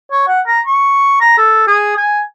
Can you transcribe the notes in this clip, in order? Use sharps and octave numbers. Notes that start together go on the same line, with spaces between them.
C#5
F#5
A#5
C#6
A#5
A4
G#4
G#5